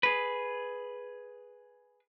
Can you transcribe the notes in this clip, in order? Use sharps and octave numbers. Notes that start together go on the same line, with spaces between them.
G#4 B4